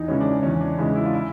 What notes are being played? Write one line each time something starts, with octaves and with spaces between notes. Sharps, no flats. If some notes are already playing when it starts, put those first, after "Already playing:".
Already playing: E2 D#4
C#3 E3 G#3 C#4
D4
C#4
E2 C#4
D4
C#3 E3 G#3 D#4
E4
F4
E4